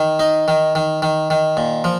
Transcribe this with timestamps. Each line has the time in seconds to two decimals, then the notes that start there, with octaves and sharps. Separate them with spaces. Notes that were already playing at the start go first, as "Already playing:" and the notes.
Already playing: D#3
0.19 D#4
0.48 D#3
0.75 D#3
1.02 D#3
1.30 D#3
1.57 A#2
1.84 F3